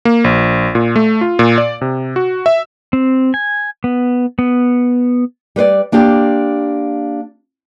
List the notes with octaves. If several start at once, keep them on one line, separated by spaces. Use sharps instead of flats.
A#3
A#1
A#2
A3
F4
A#2
D5
C3
F#4
E5
C4
G#5
B3
B3
G3 B4 C5 D5
A#3 D4 F4 G4